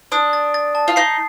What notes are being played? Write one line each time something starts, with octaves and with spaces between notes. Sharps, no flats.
D4 D#6
A6
A6
A5
F4
D#4 C7